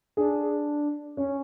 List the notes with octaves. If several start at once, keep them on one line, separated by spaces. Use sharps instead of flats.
D4 G#4
C#4 C#5